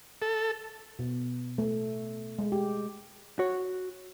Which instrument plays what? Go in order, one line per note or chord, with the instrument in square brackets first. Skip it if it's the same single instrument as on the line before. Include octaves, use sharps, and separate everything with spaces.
[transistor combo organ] A4
[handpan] B2
A3
G#3
G4
[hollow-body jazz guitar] F#4 C#5